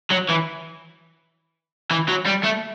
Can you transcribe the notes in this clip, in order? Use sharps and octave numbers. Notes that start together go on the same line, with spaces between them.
F#3
E3
E3
F#3
G3
A3